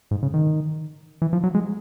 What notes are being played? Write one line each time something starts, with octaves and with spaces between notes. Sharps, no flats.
G#2
C#3
D#3
E3
F3
F#3
G#3